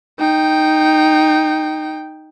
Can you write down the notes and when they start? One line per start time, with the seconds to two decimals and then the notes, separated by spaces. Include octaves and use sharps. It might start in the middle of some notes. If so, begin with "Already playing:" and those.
0.19 D#4 G5